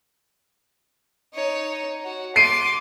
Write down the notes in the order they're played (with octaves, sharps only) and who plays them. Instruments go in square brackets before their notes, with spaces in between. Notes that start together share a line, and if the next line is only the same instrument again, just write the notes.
[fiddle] D#4 C#5
F#4
[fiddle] C6 D6 [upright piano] C7 D7 D#7